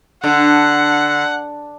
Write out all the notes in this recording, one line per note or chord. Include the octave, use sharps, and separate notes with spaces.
D3 F#5